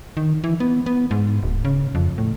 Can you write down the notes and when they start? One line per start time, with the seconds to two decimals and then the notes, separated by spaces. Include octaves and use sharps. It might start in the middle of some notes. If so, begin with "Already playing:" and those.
0.17 D#3
0.44 E3
0.60 B3
0.86 B3
1.11 G#2
1.43 D1
1.65 C#3
1.95 F2
2.18 A2